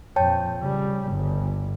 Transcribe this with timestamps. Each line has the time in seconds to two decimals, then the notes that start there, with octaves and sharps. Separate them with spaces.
0.16 F2 A#2 C#5 G5 A5
0.61 C#3 G3
1.08 G1 G2